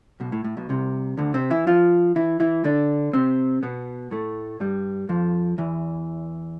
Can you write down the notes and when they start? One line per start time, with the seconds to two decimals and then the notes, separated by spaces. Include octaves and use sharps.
0.20 B1 B2
0.32 A2
0.44 A2
0.57 B1 B2
0.69 C2 C3
1.17 D2 D3
1.34 C3 C4
1.50 E3 E4
1.67 F3 F4
2.16 E3 E4
2.40 E3 E4
2.64 D3 D4
3.13 C3 C4
3.63 B2 B3
4.11 A2 A3
4.60 G2 G3
5.09 F2 F3
5.58 E2 E3